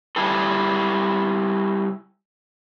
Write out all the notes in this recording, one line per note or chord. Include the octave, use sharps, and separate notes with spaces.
G3 E4 G#4 A4